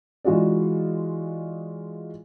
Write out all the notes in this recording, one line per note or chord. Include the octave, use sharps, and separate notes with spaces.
E3 G#3 F4 F#4 G#4 D5